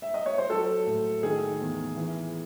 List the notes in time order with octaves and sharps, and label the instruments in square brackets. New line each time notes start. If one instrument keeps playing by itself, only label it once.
[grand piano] E5
D#5
C#5
C5
F#3 A4
A2
D#3 G#4
E2
E3